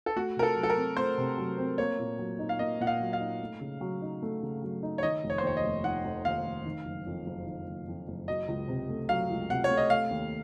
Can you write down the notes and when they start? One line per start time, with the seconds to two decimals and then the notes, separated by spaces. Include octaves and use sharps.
0.06 A4
0.16 A3 F#4
0.36 C3 A#4
0.43 A4
0.56 F#3
0.63 A4
0.70 A#4
0.77 C4
0.97 A3 C5
1.18 C3
1.38 F#3
1.58 C4
1.78 A#3 C#5
1.99 A#2
2.19 F#3
2.39 D#4
2.49 F5
2.59 A#3 D#5
2.80 A#2 F#5
2.87 F5
3.00 F#3
3.13 F5
3.20 D#4
3.40 A3
3.61 C#3
3.81 F#3
4.02 D#4
4.22 A3
4.43 C#3
4.62 F#3
4.83 D#4
4.98 C#5
5.03 D#3 D#5
5.24 F1
5.30 C#5
5.38 C5
5.43 D#2 C#5
5.57 D#5
5.64 F1
5.84 D#3 F#5
6.05 F1
6.25 D#2 F5
6.45 F1
6.65 D#3
6.85 F#1
7.06 F2
7.26 F#1
7.46 D#3
7.67 F#1
7.88 F2
8.08 F#1
8.28 F#3 D#5
8.48 C#2
8.68 C3
8.89 A3
9.09 F#3 F5
9.30 C#2
9.50 C3 F#5
9.64 C#5
9.70 A3
9.77 D#5
9.90 A3 F5
10.11 D#2